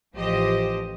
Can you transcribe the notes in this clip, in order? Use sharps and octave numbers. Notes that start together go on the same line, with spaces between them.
A1 F3 G4 C5 D#5